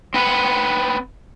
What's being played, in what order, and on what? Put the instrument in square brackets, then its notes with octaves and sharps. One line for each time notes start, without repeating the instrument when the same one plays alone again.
[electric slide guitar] C4 B4 F#5